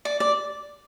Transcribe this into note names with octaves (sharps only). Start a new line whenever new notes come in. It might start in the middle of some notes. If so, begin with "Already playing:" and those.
D5
D5